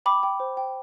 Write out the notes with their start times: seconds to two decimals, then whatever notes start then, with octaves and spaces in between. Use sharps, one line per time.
0.06 G5 B5 D6
0.23 G5
0.40 C5
0.57 G5